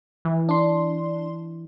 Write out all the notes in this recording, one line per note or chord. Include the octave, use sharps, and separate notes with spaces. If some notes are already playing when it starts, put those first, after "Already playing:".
E3
D4 C6